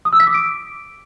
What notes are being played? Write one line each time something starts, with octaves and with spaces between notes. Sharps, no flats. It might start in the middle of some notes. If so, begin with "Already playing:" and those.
D#6
E6
B6
D6
D7